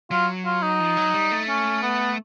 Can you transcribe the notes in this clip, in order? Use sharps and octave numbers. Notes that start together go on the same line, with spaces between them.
F#3 F4
F4
D#4
F3
F#3
G3
A3
C#4
B3